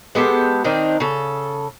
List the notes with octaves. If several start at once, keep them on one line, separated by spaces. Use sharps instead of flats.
G#3 B3 G4 A4
D#3 C4 D4 D#4
C#3 A4